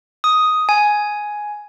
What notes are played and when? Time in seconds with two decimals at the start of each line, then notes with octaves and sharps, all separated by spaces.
0.24 D#6
0.69 G#5